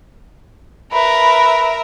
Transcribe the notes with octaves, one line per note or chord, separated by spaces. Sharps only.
A#4 B4 E5